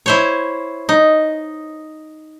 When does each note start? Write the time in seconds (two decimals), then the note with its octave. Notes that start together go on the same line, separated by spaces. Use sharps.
0.06 E4 C5 C#5
0.89 D#4